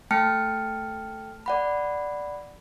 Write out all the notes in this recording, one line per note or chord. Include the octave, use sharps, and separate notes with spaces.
A3 G5 A5 F6 C#7
D5 F#5 B5